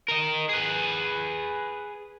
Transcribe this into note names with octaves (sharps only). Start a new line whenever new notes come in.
A#4 D#5
G#4 B4